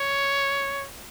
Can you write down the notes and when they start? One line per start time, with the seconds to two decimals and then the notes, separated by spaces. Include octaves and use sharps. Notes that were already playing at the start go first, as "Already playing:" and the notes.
Already playing: C#5